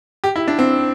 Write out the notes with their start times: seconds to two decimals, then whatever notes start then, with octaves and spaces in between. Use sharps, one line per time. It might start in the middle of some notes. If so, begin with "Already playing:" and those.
0.24 G4
0.36 E4
0.48 D4
0.59 C4